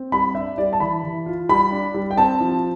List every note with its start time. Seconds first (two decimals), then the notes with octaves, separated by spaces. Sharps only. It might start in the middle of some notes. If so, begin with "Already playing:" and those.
Already playing: C4
0.12 G3 B5
0.35 D4 E5
0.58 G3 D5
0.73 A5
0.80 E3 B5
1.04 E3
1.26 F4
1.49 G3 B5
1.72 D4
1.95 G3
2.11 G5
2.17 C4 A5
2.40 F3